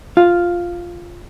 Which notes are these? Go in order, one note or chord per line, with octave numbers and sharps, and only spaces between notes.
F4 F5